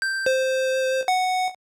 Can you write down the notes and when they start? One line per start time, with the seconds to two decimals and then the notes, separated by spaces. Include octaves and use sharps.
0.02 G6
0.26 C5
1.08 F#5